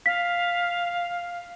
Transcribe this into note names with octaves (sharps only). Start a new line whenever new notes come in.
F5 B6